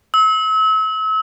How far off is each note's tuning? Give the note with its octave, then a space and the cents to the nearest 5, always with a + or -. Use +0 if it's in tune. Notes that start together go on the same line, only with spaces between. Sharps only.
E6 -35